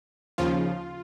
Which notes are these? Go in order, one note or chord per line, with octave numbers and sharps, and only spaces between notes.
D#2 C#3 F3 F4